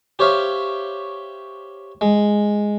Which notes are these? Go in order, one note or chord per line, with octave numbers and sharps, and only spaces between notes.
G4 C5 C#5 E5 F5
G#3